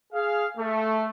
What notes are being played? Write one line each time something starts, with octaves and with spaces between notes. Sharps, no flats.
G#4 F5
A3